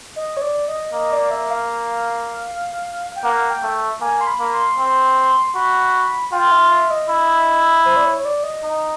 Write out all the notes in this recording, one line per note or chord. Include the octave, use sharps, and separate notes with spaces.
D#5
C#5
D5
D#5
A#3 D#5
D5
E5
F5
G5
A#3 F#5
G5
A3
A#3 G#5
C6
B5
A#3
C6
C4
F#4 B5
F4 G5
E5
E5
D#5
E4
C5
D5
C#5
C#5
D5
D#5
D#4